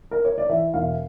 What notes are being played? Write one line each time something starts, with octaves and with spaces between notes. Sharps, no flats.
A#4
C#5
D5
E3 E5
E1 F5